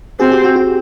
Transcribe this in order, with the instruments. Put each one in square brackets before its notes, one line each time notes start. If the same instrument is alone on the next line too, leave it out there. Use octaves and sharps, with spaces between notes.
[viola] C4 [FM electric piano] F#4 G#4
[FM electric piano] G4
F#4
F#4